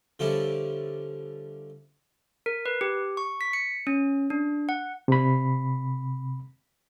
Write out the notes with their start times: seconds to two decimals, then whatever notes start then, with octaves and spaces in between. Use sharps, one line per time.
0.19 D3 F3 G3 C#4 E4
2.46 A#4
2.66 B4
2.81 G4
3.17 C#6
3.41 B6
3.53 C#7
3.87 C#4
4.30 D4
4.69 F#5
5.08 C3 B5